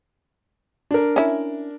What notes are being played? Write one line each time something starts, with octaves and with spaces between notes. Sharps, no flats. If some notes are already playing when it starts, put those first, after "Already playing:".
D4 A#4
C#4 E4